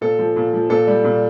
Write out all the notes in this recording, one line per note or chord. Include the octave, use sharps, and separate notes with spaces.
A#2 A4
F3
A#2
F3
A#2 A4
G3
A#2